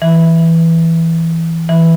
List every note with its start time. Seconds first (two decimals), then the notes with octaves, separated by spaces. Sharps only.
0.02 E3
1.69 E3